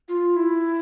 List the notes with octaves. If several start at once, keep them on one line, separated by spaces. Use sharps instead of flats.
F4
E4